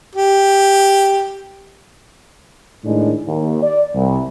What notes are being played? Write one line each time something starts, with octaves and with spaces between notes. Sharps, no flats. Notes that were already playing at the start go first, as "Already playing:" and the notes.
G4
A2 D#3 G#3 D4
D#2
D5
C2